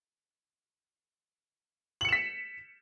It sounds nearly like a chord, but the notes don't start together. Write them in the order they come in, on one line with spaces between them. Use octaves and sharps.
F#7 C#7 E7 B6